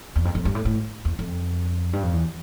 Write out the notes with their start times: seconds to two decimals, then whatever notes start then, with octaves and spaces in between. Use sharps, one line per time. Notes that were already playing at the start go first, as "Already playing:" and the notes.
0.16 E2
0.25 F2
0.35 F2
0.45 G2
0.55 A2
0.65 A2
1.05 E2
1.19 F2
1.93 G2
2.03 F2
2.13 E2